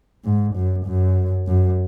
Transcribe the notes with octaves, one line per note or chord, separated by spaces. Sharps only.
G#2
F#2
F#2
F#2